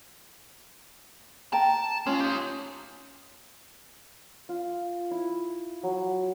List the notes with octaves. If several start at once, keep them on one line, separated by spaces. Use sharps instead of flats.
G5 A5 A#5
G#3 C#4 F4
D#4 G4
F4
E4
F#3